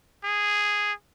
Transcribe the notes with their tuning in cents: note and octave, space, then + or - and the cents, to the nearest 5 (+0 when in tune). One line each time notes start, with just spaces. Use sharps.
G#4 -5